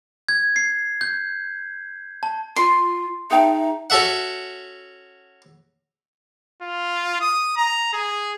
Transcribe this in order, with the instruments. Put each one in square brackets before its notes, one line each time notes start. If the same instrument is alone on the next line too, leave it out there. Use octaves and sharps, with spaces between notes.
[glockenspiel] G#6
C7
G6
A5
[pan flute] F4 [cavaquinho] C6
[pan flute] D#4 [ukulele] G#4 G5 A5 [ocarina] E5
[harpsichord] C#4 F#4 A4 E5 F#5
[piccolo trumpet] F4
D#6
A#5
G#4